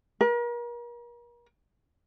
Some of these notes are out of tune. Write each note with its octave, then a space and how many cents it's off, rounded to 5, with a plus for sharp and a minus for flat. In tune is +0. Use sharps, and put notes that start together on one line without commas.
A#4 +40